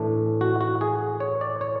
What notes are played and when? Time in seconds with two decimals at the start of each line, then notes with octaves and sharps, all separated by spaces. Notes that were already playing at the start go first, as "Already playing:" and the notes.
Already playing: A2 E3 A3 D4
0.41 F#4
0.61 F#4
0.81 G#4
1.20 C#5
1.41 D5
1.61 C#5